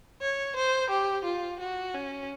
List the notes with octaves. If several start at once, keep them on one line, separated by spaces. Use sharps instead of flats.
C#5
C5
G4
F4
F#4
C#4